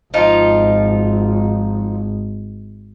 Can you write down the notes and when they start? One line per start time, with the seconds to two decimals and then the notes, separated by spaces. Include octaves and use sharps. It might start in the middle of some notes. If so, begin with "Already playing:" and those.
0.14 G#1 F3 D#4 F4